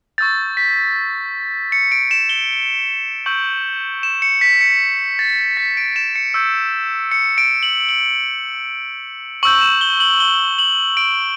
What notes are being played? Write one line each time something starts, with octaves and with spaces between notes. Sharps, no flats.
C#6 E6 G6 A6
B6
C#7
D7
E7
G7
G7
C#6 E6 G6 F#7
E7
C#7
B6
C#7
A6
B6
D7
E7
C#7
C#6 E6 G6
C#7
D7
F#7
F#7
C#6 E6 G6 F#7
E7
G7
F#7
G7
F#7
D7